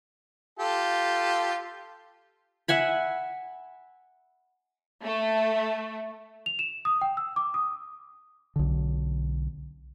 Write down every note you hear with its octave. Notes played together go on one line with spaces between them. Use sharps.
F4 G4 A4
E5 F#5 G#5 B5
A3
F7
E7
D#6
G5
E6
D6
D#6
B1 D3